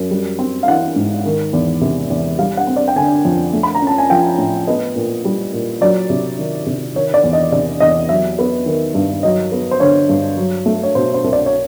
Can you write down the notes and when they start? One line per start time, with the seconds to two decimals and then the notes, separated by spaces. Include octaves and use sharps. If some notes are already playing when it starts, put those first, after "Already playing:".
Already playing: F#2
0.11 G3
0.39 C4
0.63 F5
0.68 E3 F#5
0.96 G#2
1.25 D#3
1.53 E2
1.81 C3
2.10 E2
2.38 G3 F5
2.57 F#5
2.67 C4
2.76 D5
2.88 G5
2.96 D3 G#5
3.25 F2
3.53 A3
3.63 B5
3.75 A#5
3.82 C#4 A5
3.98 G#5
4.10 F3 G5
4.38 A2
4.67 B3 D#5
4.96 A#2
5.25 G3
5.53 A#2
5.81 F#3 D5
6.10 C3
6.39 D#3
6.66 C3
6.95 D#3 C#5
7.14 D5
7.24 E2
7.33 D#5
7.52 C3 D5
7.80 E2 D#5
8.09 F#3 E5
8.39 B3
8.66 D#3
8.95 G2
9.23 F#3 D#5
9.52 B3
9.71 C5
9.80 D3 C#5
10.09 G2
10.37 F#3
10.66 A3
10.83 C#5
10.95 B2 C5
11.14 C5
11.24 C2
11.33 D5
11.46 C#5